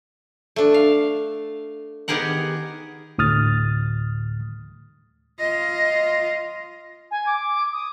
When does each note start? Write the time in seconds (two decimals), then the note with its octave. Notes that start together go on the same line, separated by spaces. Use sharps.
0.56 A3 D4
0.74 F5
2.08 D#3 B3 G4 G#4 A#4 F#5
3.18 D2 A2 D#6 F6 A6
5.40 F4 D#5
7.11 G#5
7.26 D6
7.72 D#6